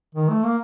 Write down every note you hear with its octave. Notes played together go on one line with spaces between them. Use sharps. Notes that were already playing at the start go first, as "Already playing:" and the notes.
D#3
A3
A#3